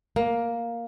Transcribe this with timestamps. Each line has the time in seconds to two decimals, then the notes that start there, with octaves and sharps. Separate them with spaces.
0.16 A#3